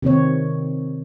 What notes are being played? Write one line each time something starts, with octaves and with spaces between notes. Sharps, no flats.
C3 D#3 C4 C#5